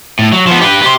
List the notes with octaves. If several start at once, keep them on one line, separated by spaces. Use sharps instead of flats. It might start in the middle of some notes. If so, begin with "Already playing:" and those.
A2
F#3
F3 B3
G4 B4
G4 C6